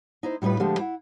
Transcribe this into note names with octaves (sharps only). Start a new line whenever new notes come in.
D#4 E4 C5
A2 G3 D#4 F4 B4
D3 F3 G#3 A3 G4
E4 F#5